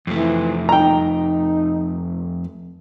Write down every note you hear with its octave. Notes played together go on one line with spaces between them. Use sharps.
F2 E3 A3
D#4 G5 A#5